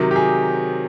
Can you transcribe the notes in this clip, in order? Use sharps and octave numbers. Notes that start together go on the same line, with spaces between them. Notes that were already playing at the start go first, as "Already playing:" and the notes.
Already playing: C3 D#3 F#3
G4
G#4